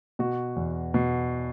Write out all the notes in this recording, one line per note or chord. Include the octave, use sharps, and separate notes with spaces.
B2 F#4
E2
B2